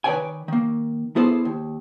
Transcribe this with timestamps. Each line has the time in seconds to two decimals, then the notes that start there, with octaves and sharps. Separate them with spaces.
0.04 D#3 B4 C#5 D5 G5 G#5
0.48 D#3 A#3
1.16 B3 E4 G#4 A4 C5 D5
1.45 D#2